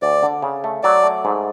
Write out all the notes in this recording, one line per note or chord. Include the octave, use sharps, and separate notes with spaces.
D2 D5
D3
C#3
A3
F#3 D5
A3
G#2